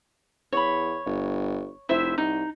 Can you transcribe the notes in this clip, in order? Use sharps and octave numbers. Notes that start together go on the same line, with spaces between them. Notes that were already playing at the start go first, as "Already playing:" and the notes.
E2 C#5 B5
G1
F1 E4 C5 E5
C2 D#4